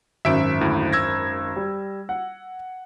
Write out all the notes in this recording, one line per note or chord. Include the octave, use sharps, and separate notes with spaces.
G#1 F#2 E5 D7
D2 E4
E6 G#6 A#6
G3
F#5